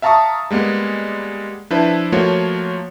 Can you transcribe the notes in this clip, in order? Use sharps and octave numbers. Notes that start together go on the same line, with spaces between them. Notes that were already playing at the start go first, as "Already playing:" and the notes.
E5 F5 A5 A#5 C#6 D#6
G3 G#3 A#3 B3
F3 D4 E4 B4 C5 E5
F3 A3 A#3 F4 F#4 C#5